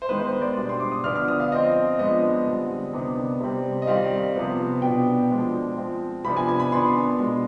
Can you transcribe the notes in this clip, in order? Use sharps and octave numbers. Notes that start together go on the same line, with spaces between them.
C5
D#3 G#3 B3 B4
B4
C5
D5
B2 G3 D4
C6
D6
D#6
D3 F3 B3 D4 F6
F6
D#6
F5
F3 C4 D#5
F3 G#3 B3 D4 D#5
D3 G3 C4
C3 D#3 B3 D4
C3 G3 C4
D#5
D#3 G3 C4 F5
C3 F3 B3
B2 B3 D4 G5
F3 G#3 D4
F3 C4
C3 F3 B3 D4 B5
G#5
G#5
B5
D#3 B3 D4 C6
B2 G#3 D4